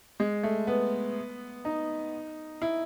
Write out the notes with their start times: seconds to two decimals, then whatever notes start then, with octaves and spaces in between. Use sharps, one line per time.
0.20 G#3
0.43 A3
0.67 B3
1.65 D#4
2.62 E4